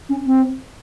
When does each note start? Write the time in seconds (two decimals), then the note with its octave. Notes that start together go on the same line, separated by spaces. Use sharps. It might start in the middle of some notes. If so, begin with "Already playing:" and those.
0.09 C#4
0.26 C4